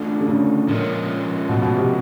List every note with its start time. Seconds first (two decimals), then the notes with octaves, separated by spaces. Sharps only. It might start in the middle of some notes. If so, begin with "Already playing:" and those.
Already playing: D3 A3 D4 F4
0.20 D3
0.29 C#3
0.68 A#2 F3 G#3 C#4
1.49 B2
1.62 B2
1.77 C3